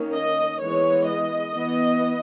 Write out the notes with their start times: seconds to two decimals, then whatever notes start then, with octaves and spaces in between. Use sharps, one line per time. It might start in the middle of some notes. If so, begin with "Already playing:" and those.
Already playing: D#3 A#3 C#4
0.12 D#5
0.60 E3 G#3 B3 C#5
1.06 D#5
1.54 E3 B3